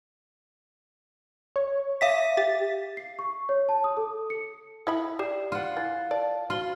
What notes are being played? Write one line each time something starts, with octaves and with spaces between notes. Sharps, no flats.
C#5
E5 F5 B6
G4 A6
C7
C#6
C#5
A5
D#6
A4
C#7
E4 E5 F5 G5 B5 D#6
G4 D5 C7 E7
F4 F#5
E3 A6
D5 A5
F4 F#4 F#7 G7